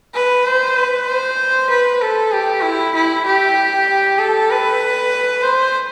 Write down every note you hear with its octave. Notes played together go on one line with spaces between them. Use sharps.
B4
C5
B4
C5
B4
A4
G4
E4
E4
G4
A4
B4
C5